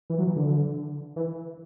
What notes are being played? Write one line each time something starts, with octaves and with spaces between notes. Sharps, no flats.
E3
F#3
E3
D3
E3